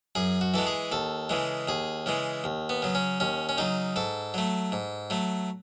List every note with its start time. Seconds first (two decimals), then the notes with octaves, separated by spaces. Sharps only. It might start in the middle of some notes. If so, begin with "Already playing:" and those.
0.15 F#2 G#4
0.41 F#4
0.54 E3 G#3 A4
0.67 G#4
0.92 D#2 A4
1.29 C#3 E3 G#3
1.68 D#2 G#4
2.06 C#3 E3 G#3
2.44 D#2
2.69 B3
2.82 C#3 F#3
2.95 C#4
3.20 D#2 C#4
3.49 C#4
3.58 C#3 F#3 D#4
3.96 G#2 A4
4.34 F#3 A3
4.72 G#2
5.10 F#3 A3